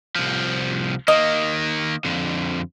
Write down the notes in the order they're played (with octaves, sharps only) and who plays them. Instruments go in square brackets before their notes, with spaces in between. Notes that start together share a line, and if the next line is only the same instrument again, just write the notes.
[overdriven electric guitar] C2 F3
[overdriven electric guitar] D#3 A#3 [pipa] D#5
[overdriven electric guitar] F2 D3